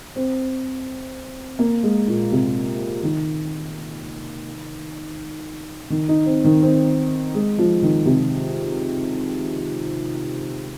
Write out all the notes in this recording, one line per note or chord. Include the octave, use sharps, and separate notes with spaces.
C4
A#3
G#3
A#2
C3
D#3
D#3
D#4
C4
D#3
C4
G#3
F3
D#3
C3